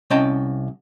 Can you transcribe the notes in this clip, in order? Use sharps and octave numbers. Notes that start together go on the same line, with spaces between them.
C2 C#4 D#5 G5 A5